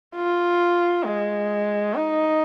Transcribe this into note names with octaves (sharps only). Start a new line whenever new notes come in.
F4
G#3
D#4